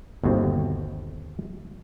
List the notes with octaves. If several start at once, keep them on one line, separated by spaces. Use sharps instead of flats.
G1 D#2 B2 C4